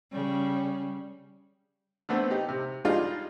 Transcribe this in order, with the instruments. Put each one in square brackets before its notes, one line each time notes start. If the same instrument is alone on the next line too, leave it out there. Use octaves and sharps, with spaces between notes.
[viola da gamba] C#3 G3
[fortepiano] D3 A3 B3 C4
D#4 G4
C3
G3 G#3 D4 D#4 F4